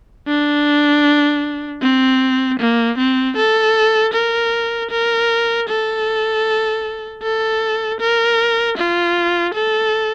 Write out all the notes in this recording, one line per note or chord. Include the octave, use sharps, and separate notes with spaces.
D4
C4
A#3
C4
A4
A#4
A#4
A4
A4
A#4
F4
A4